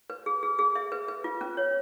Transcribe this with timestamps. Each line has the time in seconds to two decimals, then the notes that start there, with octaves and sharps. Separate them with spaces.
0.10 B4
0.26 G#4
0.43 G#4
0.59 G#4
0.75 E5
0.92 B4
1.08 B4
1.24 F4
1.41 C#4
1.57 C#5